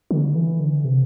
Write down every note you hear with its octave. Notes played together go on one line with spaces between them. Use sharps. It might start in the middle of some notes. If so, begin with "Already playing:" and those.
D3
E3
D3
C3